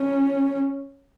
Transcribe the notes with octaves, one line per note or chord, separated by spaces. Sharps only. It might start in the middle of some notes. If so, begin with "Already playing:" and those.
Already playing: C#4